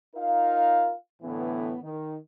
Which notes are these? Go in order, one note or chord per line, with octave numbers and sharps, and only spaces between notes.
D#4 F4 A#4 F5
A2 D3 E3 B3
D#3